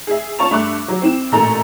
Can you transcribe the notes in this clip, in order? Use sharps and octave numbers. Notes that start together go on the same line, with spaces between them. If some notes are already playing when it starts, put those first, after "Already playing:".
G#4 E5
C#4 F4 A5 C#6 F7
G2 A3 E5 B5 D6 F#6
F#3
C4 E4 E7
A1 A#2 A3 A4 A#5